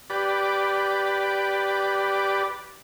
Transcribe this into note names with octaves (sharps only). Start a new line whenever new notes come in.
G4 B4 D5